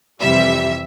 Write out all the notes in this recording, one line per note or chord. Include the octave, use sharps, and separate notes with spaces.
F2 C3 E3 G3 E5